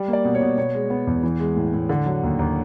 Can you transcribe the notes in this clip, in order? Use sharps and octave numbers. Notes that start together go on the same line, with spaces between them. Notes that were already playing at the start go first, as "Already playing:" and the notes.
Already playing: G3
A#3
D5
B2
C#5
B2
B2 C#5
G#3
B3
E2
E3
G#3
A2
A2
D3
F#3
D#2
D#2